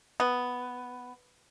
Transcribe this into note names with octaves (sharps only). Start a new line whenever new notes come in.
B3